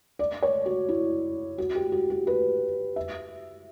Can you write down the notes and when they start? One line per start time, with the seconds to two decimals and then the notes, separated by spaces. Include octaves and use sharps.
0.19 D5
0.43 C#5
0.66 F#4
0.89 E4
1.58 F#4
1.75 G4
1.92 F#4
2.10 F#4
2.27 B4
2.96 E5